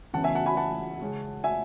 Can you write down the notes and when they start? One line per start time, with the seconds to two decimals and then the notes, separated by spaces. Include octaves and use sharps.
0.14 C#3 E3 B3 F#5 A5
0.24 E5 G#5
0.35 F#5 A5
0.46 G#5 B5
0.57 F#5 A5
1.01 C#3 G#3 C#4
1.44 E5 G#5